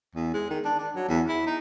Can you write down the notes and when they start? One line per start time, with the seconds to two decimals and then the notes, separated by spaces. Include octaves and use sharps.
0.15 E2
0.34 G#3
0.50 D#3
0.65 D4
0.79 D4
0.96 F#3
1.09 E2
1.29 E4
1.47 D#4